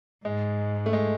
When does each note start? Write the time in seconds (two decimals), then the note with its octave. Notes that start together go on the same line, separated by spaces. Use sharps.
0.25 G#2 G#3
0.86 A3
0.93 G#3